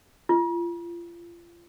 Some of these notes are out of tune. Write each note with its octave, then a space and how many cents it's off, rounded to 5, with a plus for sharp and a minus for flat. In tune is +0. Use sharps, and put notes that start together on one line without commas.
F4 -30